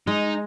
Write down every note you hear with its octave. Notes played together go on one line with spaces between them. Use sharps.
G#3 D#4